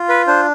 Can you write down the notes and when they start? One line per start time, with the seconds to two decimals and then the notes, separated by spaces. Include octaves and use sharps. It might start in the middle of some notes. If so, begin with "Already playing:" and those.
Already playing: F4
0.09 B4
0.27 D4 C5